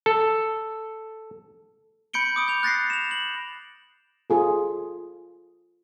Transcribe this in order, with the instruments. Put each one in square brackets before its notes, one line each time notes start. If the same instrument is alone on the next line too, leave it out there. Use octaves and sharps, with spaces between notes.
[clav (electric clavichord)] A4
[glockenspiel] B5 G6 C#7 D7 G7
D6 D#6 D7
G6 F7
F#6 A6 A#6 C7
E7 F7
F#7
[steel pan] F4 G#4 A4